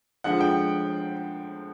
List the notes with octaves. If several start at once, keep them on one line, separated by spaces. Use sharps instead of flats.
D3 F3 G#3 F#5
G5